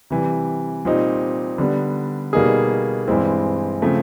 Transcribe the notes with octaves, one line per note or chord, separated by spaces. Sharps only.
C3 E3 G3
A#2 G3 C4 D#4
D3 G3 B3
B2 G3 A#3 D#4 G#4
G2 E3 G#3 C4 E4
C#3 F3 A3 C4